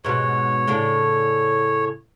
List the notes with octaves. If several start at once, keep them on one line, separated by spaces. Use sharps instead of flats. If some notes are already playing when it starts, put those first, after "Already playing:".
G#2 B2 C#5
A2 C#3 D4